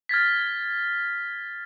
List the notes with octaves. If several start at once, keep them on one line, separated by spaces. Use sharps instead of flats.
F6 G#6 A6 B6